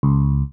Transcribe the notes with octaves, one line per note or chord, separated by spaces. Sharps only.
C#2